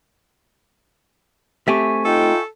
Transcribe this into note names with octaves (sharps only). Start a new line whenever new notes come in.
A3 C4 G4 E5 G#5 C#6
D#4 F4 A4 G5